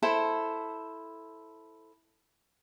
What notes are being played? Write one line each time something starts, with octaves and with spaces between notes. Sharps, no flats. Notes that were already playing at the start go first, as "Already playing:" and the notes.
E4 A4 C5